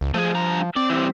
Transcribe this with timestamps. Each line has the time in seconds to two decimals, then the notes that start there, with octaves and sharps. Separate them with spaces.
0.01 C#2
0.14 F3 A3 G#4
0.35 G2 A#5
0.76 C4 D5
0.90 E3 G3